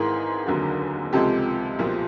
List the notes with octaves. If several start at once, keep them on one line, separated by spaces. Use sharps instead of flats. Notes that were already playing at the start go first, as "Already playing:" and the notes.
Already playing: G#1 G#2 E3 G#4 A#4
F1 D#2 D3 F#3
C#2 C3 F3 G#3 G4 A4
B1 A#2 F3